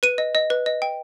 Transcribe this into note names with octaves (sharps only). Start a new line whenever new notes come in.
B4 D#7
D#5
D#5
B4
D#5
G5